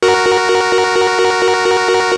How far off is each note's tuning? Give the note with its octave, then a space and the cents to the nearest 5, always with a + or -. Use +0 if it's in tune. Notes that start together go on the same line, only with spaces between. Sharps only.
F#4 +0 A#4 +0